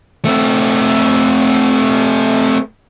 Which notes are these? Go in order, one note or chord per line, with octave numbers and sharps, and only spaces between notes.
A3 C4